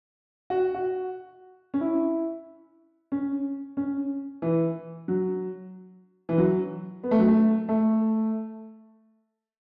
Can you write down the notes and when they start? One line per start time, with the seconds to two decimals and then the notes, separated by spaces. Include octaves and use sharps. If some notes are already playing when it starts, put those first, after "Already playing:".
0.50 F#4
0.75 F#4
1.74 C#4
1.81 E4
3.12 C#4
3.77 C#4
4.42 E3
5.08 F#3
6.29 E3
6.38 F#3
7.03 B3
7.11 A3
7.19 F#3
7.28 A3
7.69 A3